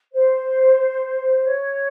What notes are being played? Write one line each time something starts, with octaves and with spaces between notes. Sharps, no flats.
C5
C#5